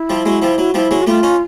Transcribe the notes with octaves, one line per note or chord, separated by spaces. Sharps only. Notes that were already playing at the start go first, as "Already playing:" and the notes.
Already playing: E4
F3 G3
F#3 G#3
F3 G3
F#3
F3 G3 E4
F#3 G#3
F#4
G3 A3 F4
C#4 D#4